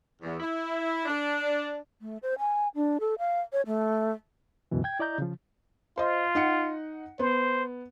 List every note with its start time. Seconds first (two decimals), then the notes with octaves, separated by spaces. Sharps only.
0.22 E2
0.40 E4
1.06 D4
2.01 A3
2.23 C5
2.39 G#5
2.75 D4
3.00 A4
3.18 F5
3.52 C#5
3.66 A3
4.71 C#2 F#2 B2 E3
4.84 G5 G#6
4.99 E4 D5 D#5 A#5 G6
5.18 C#3 F3
5.98 F4 C5 D#5
6.35 D#4 F#5 C#7
7.19 B3 C5